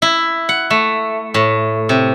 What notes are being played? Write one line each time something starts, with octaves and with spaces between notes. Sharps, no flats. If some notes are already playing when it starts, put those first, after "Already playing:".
E4
F#5
A3
A2
C3